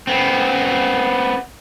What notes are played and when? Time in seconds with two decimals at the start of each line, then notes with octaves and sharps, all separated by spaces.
0.07 B3 C4